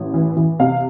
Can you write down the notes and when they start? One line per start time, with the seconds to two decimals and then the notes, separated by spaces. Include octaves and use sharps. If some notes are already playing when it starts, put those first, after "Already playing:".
Already playing: A1
0.14 E3
0.37 E3
0.59 C3 F5